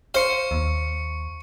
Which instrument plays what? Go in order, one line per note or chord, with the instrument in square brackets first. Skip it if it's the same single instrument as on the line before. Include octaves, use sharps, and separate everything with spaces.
[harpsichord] C5 F5 [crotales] C#6 C#7
[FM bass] D#2